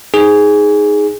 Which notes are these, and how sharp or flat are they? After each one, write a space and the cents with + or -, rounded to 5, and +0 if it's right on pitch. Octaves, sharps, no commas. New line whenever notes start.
D#4 +0 G#4 +0